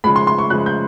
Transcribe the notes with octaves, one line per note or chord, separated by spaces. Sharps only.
C#3 F3 G#3 B5
C6
C6
C#6
C#3 F3 G#3 F#6
G6